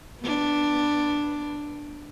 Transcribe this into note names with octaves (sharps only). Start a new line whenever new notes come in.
B3 D4